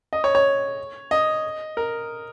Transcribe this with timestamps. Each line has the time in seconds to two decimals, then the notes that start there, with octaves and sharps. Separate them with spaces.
0.13 D#5
0.24 C#5
0.35 C#5
1.11 D#5
1.77 A#4